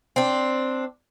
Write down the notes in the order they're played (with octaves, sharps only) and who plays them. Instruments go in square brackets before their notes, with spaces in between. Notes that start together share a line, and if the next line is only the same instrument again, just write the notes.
[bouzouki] C4 D4